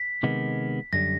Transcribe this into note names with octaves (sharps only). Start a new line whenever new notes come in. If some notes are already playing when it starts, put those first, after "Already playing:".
Already playing: B6
C3 D#3 G#3 B3
F#2 D3 G3 A#6